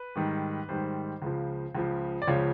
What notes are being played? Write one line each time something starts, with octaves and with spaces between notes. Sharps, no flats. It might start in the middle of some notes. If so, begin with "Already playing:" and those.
Already playing: B4
G#2 D#3 G3
G#2 D#3 G3 C5
C#2 C#3 F3
C#2 C#3 F3
D5
C#2 C#3 F3 C#5